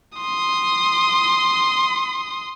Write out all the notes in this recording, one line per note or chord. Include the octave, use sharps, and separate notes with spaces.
C6 D#6